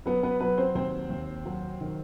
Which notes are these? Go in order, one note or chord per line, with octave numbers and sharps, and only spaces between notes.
F#3 B3 B4
B3 B4
F#3 B3 B4
C4 C5
D#2 C4 C5
D#2
F#3
D#3